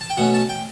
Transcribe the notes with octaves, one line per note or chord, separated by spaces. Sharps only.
A5
G5
B2 A3 C#4 F#5
A5
G5